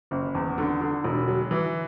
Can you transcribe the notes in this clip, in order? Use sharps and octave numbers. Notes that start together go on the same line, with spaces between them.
F#1
E2
D3
D3
E1
F#3
E3